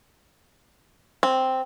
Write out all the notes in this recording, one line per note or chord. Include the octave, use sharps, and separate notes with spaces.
C4